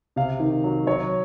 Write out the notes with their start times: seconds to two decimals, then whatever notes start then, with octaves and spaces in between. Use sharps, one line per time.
0.16 C3 F5
0.40 D#3
0.64 F#3
0.87 F#3 C#5